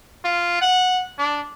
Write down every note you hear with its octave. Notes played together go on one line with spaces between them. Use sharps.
F4
F#5
D4